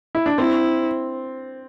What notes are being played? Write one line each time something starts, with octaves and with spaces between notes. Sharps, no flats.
E4
D4
C4 E4